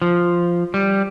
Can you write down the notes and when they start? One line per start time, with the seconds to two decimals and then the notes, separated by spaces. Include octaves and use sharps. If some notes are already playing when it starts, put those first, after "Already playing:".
0.02 F3
0.74 G3